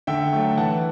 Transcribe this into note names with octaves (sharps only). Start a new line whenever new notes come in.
D3 E5 G5
F#3 A3
E3 F#5 A5